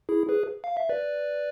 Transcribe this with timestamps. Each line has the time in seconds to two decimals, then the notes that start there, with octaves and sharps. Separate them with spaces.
0.09 E4 G#4
0.29 G#4 B4
0.64 F5
0.77 E5
0.89 B4 D5